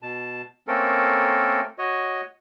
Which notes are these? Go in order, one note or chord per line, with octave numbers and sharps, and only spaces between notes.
B2 A5
A3 A#3 C4 C#4 A4 A#4
F#4 C#5 D#5